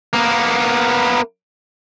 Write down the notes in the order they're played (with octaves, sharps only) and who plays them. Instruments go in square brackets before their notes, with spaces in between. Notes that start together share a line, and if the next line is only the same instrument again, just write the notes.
[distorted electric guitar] A#3 B3